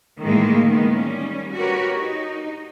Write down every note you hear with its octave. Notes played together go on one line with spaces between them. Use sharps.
A2 D#3 E3 F#3 G#3 A#3
D#3 B3
G3 C#4
F#4 G4 A#4 B4 C#5
D#4